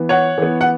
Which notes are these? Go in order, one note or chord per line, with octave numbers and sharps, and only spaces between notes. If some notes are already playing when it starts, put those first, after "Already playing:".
Already playing: E3 B3
C#5 F#5
E3 B3
F#5